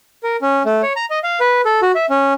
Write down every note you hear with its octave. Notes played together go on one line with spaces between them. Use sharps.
A#4
C#4
A3
C#5
A#5
D#5
F5
B4
A4
F#4
E5
C#4